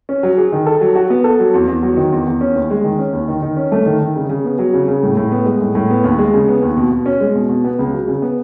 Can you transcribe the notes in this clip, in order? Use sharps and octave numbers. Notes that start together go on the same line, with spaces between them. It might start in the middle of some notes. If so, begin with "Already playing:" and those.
C#4
F#3
G#4
D#3
A4
F#3
F#4
B3
A4
F#3
E2
E2
F#3
D#3
E2
E2
C#4
D#2
G#3
D#3
C#4
D#2
D#3
D#3
C#4
A3
D#3
D#3
C#3
C#3
B3
F#3
C#3
C#3
A2
A2
B3
G#3
A2
A2
B3
D#2
G#3
C#3
B3
D#2
B2
B2
C#4
G#3
B2
B2
B3
C#2
F#3
C#3
B3